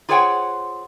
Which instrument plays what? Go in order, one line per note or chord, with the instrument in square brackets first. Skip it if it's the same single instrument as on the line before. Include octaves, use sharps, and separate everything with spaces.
[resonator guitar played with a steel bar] F4 G#4 C5 C#5 F#5 G5